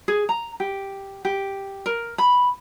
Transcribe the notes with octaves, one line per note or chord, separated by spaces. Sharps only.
G#4
A#5
G4
G4
A#4
B5